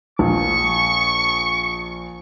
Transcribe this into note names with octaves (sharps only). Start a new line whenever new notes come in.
A#1 C#6